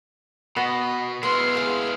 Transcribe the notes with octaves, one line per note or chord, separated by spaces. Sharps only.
B2 B3 D#5 B5
G#3 B3 E4 C6 F6
G#4 F5